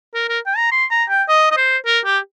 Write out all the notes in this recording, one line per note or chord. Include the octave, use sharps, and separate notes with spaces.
A#4
A#4
G5
A#5
C6
A#5
G5
D#5
D#5
C5
A#4
G4